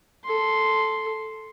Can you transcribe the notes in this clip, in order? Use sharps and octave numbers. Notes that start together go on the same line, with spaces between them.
A4 C6